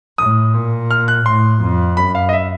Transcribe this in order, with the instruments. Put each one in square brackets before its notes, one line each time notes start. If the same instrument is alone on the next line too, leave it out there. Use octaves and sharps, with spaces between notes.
[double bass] A2 [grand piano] D#6
[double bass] A#2
[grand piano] F6
F#6
[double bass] A2 [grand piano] C6
[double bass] F2
[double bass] F#2 [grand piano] B5
[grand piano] F5
D#5
E5